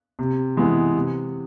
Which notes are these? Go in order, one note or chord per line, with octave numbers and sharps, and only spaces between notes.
C3
E3 G#3 B3 E4
C3